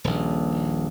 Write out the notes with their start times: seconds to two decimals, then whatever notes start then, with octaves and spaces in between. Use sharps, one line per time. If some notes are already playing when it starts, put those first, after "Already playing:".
0.04 D#1 A#1